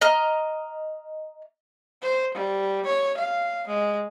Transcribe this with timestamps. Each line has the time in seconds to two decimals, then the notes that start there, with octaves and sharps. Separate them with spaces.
0.01 D#5 A#5 F6
2.03 C5
2.34 G3
2.86 C#5
3.18 F5
3.68 G#3